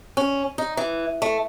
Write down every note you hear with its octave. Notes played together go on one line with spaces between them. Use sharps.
C#4
D#4
E3
A3